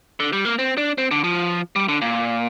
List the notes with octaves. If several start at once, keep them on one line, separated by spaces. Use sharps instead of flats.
D3
G3
A#3
C4
D4
C4
D3
F3
G3
D3
A#2